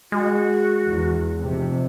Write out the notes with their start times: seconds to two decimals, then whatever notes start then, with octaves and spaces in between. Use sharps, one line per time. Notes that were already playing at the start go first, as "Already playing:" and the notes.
0.12 G#3 F#4
0.86 E2
1.42 F1 F2 C3